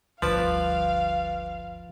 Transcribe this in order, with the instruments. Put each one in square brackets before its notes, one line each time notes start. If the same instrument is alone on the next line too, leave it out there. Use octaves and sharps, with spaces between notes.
[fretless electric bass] G1 D2 [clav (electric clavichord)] F3 [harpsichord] B4 D5 A5 [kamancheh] F5